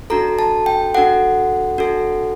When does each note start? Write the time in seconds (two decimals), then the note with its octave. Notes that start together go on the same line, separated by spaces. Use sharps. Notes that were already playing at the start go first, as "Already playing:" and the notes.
0.10 D4 F#4 A4 A#5
0.39 A5
0.66 G5
0.94 D4 F#4 A4 F#5
1.78 D4 F#4 A4